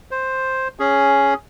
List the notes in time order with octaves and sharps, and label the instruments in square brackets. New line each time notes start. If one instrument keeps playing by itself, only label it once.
[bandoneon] C5
C#4 G#4